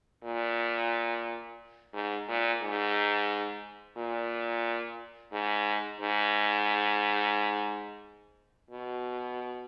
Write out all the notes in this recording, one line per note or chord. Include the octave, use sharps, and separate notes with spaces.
A#2
G#2
A#2
G#2
A#2
G#2
G#2
B2